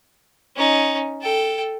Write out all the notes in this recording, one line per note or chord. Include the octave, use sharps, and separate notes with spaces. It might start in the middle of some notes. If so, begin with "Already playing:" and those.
C#4 D#4
A4 G5